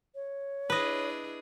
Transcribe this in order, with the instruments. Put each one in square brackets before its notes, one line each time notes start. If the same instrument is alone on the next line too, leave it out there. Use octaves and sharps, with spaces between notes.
[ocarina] C#5
[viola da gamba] D4 E4 G#4 [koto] B4 D#5